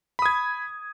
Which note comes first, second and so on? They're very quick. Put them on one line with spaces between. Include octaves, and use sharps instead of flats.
B5 D#6 G#6